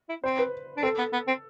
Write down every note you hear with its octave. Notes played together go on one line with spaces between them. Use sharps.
E4
C4 C5
B4
D4
C4 A4
B3
B3
C4